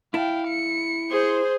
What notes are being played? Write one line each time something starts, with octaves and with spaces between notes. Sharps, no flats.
E4 F5 G5 A5
C#7
G#4 C5